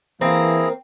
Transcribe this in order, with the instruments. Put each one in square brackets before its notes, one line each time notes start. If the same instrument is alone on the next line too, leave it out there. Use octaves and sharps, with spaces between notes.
[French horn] E3 [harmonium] A#3 [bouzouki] C4 [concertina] E4 G#4 A#5